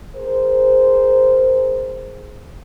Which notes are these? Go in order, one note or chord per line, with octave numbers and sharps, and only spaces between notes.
G#4 A#4 C5